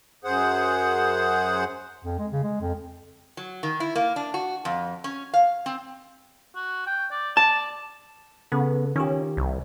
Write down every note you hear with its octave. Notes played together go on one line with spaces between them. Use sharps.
F#2 G#4 C5 F#5
F2
G#3
C#3
G#3
F2
F#3
D#3
E4
A#3
D4
F#4
F2
C#4
F5
C4
F#4
G5
D5
D5 A5
C#3 B3 A4
D#3 C#4 F4 G4
C2